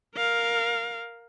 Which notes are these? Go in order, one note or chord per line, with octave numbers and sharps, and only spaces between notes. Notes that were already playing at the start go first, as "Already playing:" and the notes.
A#4 F5